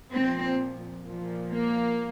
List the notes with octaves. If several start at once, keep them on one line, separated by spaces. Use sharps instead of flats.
A#2 F3 C4
A#2 F3
A#3